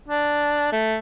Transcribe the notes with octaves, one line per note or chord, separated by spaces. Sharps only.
D4
A3